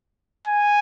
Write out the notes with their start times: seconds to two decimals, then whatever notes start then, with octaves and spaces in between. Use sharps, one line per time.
0.47 G#5